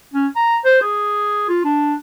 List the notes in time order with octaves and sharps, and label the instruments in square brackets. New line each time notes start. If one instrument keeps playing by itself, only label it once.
[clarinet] C#4
A#5
C5
G#4
F4
D4